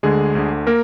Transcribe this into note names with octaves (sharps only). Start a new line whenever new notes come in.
D2 D3 G#3 G#4
D2 D3
A#3 A#4